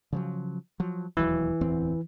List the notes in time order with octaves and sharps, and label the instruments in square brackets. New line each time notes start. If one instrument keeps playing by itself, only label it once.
[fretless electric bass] C#3 F3 F#3
F3 F#3
[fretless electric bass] E1 D#2 F#3 [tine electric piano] E3
[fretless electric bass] D1 E2 C4